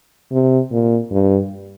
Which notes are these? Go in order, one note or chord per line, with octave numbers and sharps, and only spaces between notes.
C3
A#2
G2